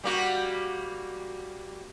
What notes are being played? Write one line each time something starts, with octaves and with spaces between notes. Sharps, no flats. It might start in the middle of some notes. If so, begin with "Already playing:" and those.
G3 A#3 F#4